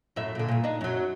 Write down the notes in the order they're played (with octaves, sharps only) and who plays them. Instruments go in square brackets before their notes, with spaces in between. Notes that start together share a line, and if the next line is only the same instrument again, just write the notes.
[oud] F#2 A2 E5
A#2 D3
G2 A#2
D4 D#4
F#2 F#3